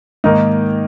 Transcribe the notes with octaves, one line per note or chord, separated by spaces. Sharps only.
G#2 D#3 A#3 D#4